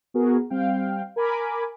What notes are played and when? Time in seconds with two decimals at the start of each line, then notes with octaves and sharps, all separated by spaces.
0.14 B3 F#4 G#4 A#4
0.50 G3 C4 F5 G5
1.16 A#4 G#5 B5 D6